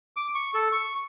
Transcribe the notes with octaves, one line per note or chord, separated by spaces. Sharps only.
D6
C#6
A4
C#6